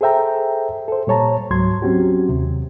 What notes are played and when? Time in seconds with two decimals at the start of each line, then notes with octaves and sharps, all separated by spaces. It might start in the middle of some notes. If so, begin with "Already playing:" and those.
0.01 G#4 A4 C5 E5 G5 A#5
0.88 A4 C5
1.07 A#2 G3 C#5 A5 A#5
1.51 C#2 G#2 F#3 C6 G#6
1.82 F#3 C4 C#4 F#4 G4
2.29 D#2 C3